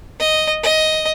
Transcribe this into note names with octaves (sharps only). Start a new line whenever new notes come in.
D#5
D#5